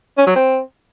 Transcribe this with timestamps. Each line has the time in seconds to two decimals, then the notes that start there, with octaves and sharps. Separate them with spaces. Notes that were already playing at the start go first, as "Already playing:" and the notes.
0.18 C#4
0.27 F#3
0.35 C4